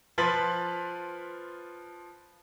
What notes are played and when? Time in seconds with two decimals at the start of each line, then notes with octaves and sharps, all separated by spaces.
0.18 F3 F4 B4 A6 B6 F#7